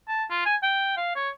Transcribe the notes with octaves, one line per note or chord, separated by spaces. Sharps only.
A5
F4
G#5
G5
F5
C#5